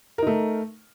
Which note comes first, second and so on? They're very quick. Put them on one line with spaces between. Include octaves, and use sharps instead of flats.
A#4 D#4 A3